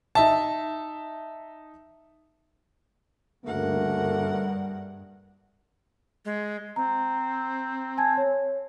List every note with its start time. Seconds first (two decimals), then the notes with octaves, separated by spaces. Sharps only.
0.15 D#4 E5 A5
3.45 D2 G2 C#3 A3 A#3 A#4 F#5
6.25 G#3
6.76 C4 A#5
7.98 G#5 A5 G#6
8.17 C#5